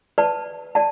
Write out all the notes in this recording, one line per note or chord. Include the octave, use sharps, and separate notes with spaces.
B4 D5 A5
D5 A5